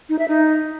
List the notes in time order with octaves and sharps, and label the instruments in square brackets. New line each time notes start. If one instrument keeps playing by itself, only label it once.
[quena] D#4
E5
D#4